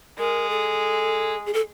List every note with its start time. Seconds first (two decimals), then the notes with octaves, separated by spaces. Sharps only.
0.18 G#3 A#4
0.50 A4
1.46 G#4
1.54 A4